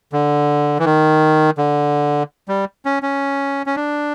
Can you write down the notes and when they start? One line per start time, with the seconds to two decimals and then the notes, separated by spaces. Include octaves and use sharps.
0.13 D3
0.79 E3
0.85 D#3
1.58 D3
2.48 G3
2.85 C#4
3.03 C#4
3.66 C#4
3.76 D4